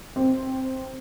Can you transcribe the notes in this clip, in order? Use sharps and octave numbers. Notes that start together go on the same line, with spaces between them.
C4